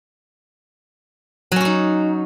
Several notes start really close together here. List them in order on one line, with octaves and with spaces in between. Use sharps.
F#3 C#4 F#4 D#4